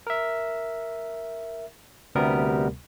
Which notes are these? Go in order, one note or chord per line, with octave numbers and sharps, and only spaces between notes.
A#4 E5
D2 C3 G3 B3 A#4